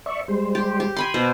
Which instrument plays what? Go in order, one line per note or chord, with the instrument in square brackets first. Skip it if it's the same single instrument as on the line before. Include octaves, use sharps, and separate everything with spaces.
[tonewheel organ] D5 E5 C#6
G3 G#3 C5
[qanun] G4
G4
G#5 B5 C6
[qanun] B2 C5 [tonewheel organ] A#6